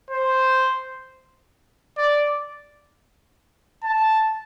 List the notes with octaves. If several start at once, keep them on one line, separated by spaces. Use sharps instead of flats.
C5
D5
A5